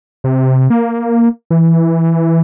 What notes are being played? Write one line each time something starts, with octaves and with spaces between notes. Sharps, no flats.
C3
A#3
E3